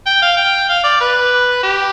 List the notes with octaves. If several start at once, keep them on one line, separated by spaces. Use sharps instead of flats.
G5
F5
G5
F5
D5
B4
G4